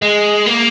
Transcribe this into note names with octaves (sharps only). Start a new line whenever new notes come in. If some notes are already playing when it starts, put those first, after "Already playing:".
G#3
A#3